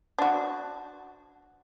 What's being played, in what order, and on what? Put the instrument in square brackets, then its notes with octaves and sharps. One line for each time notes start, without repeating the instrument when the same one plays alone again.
[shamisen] D4 F#4